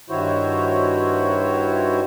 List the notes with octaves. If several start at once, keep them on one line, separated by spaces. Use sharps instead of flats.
G2 D#3 E4 F#4 C5 C#5